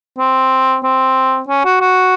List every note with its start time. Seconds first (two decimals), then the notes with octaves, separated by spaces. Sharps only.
0.19 C4
0.84 C4
1.49 C#4
1.65 F#4
1.81 F#4